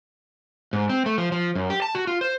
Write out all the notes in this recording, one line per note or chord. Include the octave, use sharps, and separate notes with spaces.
G#2
C4
A3
F3
F3
F#2
G4
A5
F#4
F4
C5